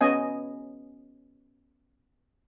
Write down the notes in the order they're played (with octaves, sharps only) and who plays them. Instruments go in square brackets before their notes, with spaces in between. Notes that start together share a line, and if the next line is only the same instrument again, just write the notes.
[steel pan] B3 C#4 D#5 G#5